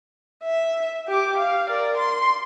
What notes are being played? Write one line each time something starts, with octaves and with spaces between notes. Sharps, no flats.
E5
G4 D6
F5
A#4 D5
C6